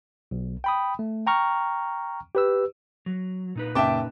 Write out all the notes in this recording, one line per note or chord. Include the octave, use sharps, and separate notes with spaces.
B1
G5 B5 D#6
A3
G5 A#5 C#6 F6
G4 B4 E6
F#3
A#2 D#4 B4
F#1 E5 G5 A5 D6